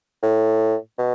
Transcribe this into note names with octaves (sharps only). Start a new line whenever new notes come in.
A2
B2